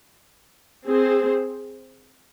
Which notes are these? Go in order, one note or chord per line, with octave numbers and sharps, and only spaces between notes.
C4 G#4 C5